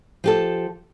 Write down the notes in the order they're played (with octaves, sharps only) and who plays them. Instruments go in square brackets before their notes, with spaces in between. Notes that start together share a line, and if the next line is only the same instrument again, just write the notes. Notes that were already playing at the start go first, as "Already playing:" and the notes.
[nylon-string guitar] F3 G4 A4